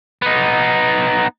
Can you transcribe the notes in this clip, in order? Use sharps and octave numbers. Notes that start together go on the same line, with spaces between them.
B3 D#4